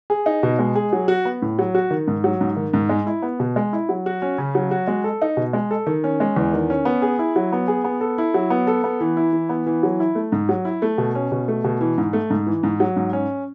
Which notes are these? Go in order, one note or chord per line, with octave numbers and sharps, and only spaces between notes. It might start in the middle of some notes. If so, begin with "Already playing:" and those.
G#4
D#4
B2
G#3
G#4
F#3
F#4
B3
A2
F#3
F#4
D#3
G#2
F#3
G#2
D#3
G#2
G#3
E4
B3
B2
G#3
E4
F#3
F#4
C#4
C#3
F#3
F#4
G#3
A4
D#4
B2
G#3
A4
D#3
C#4
G#3
E2
D#3
C#4
B3
G#4
E4
F#3
B3
G#4
B3
A4
E4
F#3
B3
A4
B3
E3
E4
E3
B3
E3
F#3
E4
A3
G#2
F#3
E4
A3
B2
C#4
B2
A3
B2
E3
G#2
A3
G#2
E3
G#2
F#3
G#2
C#4